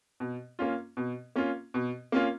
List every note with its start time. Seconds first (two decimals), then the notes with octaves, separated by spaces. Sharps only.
0.20 B2
0.59 A#3 C#4 F4
0.97 B2
1.36 A#3 C#4 F4
1.74 B2
2.12 A#3 C#4 F4